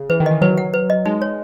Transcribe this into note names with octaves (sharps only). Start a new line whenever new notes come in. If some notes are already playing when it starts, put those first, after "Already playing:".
Already playing: C#3
E3 B4
D#3
E3 D#5
F#3 B4
F#5
B4
D#5
G#3 D#4
C#5